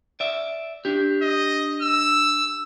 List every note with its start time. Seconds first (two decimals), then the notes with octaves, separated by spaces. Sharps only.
0.20 D5 E5
0.85 D4 G4
1.22 D#5
1.82 E6